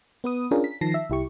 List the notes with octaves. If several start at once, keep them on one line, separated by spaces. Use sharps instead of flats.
B3 B4 D#6
C#4 D4 F4 G#4 A#4
B6
D#3 F3 A5 A#6 C7
E5
C2 E4 G4 C#6